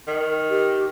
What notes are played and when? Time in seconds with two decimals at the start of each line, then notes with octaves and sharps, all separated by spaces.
0.07 D#3
0.50 G4